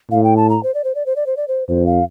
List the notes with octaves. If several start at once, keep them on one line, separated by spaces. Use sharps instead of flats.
A2 F5
G5
A5
A#5
C5
D5
C5
D5
C5
D5
C5
D5
C5
F2 C5
F5